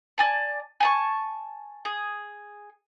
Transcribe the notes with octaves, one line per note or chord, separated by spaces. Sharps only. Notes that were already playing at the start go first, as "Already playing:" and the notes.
D5 G#5 A5
G#5 A5 C#6
G#4